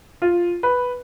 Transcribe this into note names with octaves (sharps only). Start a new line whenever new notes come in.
F4
B4